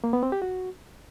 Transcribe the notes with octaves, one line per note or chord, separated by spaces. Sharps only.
A#3
B3
C4
G4
F#4